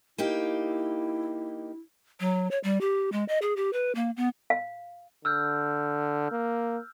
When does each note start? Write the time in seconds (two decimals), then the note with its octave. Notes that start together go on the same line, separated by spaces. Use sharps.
0.18 A#3 D#4 E4 G4
2.20 F#3
2.51 C#5
2.64 G3
2.81 G4
3.12 G#3
3.28 D#5
3.42 G#4
3.57 G4
3.73 B4
3.95 A#3
4.17 B3
4.50 F5
5.25 D3 E6 F6 G6
6.32 A#3